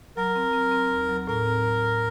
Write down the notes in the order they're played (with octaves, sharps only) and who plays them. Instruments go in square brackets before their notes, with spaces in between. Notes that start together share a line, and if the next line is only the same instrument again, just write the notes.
[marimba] F#3 [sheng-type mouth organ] A#4
[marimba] C4
C4
C4
D#2
F#3
[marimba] A2 [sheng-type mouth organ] A#4
[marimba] C4
A2
A2